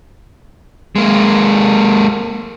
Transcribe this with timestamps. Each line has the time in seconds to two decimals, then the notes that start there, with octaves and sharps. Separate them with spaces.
0.96 G#3 A#3